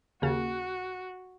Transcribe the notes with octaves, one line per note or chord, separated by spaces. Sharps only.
D#2 C#3 F#4